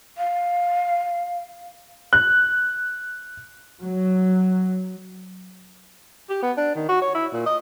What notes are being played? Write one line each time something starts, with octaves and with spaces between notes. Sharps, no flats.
F5
F#6
F#3
G4
B3
D4
D#3
F#4
C#5
E4
A#2
D#5